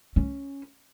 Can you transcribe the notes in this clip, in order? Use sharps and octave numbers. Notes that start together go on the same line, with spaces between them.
C#4